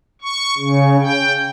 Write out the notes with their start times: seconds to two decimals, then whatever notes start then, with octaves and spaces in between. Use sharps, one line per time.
0.22 C#6
0.58 C#3
1.01 G5